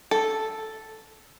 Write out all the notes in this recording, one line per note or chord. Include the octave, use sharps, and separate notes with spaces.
A4